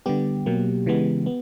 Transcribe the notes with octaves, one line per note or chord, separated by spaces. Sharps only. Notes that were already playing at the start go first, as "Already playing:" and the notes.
D3 G3 B3 G4
B2 F#3 A#3
C#3 E3 G#3 B3
B3